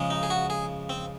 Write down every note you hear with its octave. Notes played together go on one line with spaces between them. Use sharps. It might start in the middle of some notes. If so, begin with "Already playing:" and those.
Already playing: C#3 F3 G#3
D#4
G#4
F#4
G#4
C4